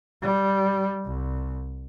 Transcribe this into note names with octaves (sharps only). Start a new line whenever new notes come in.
G3
C2